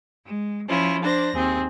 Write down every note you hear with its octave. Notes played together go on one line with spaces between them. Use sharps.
G#3
F3 C#4 E4 F4
D4 C5 A#6
D#2 C4 G#4